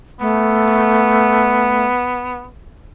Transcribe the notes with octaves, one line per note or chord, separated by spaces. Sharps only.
A3 B3